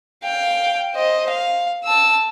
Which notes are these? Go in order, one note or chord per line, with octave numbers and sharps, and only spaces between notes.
F5 G5
C5 D#5
F5
A5 E6